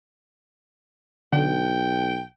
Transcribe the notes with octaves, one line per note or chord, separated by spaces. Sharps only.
B1 D3 G5